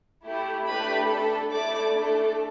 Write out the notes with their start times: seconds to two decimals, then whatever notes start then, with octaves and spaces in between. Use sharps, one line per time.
0.24 A3 E4 G4
0.67 A3 D4 G4 B4 B5
1.09 D4 A4
1.52 A3 E4 A4 D5 D6
1.95 A3 D4 A4